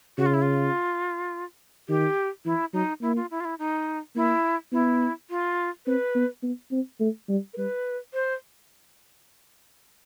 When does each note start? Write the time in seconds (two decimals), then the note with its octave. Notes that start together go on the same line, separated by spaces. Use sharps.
0.18 C#3 F#4
0.26 F4
0.34 E4
0.42 F4
1.89 D#3 G4
2.45 E3 E4
2.74 F#3 D#4
3.02 A#3 E4
3.16 F4
3.31 E4
3.40 F4
3.45 E4
3.59 D#4
4.16 A#3 E4
4.72 B3 E4
5.30 F4
5.86 C4 B4
6.15 B3
6.43 B3
6.72 C4
7.00 A3
7.29 G3
7.54 A#4
7.57 G3 B4
8.14 C5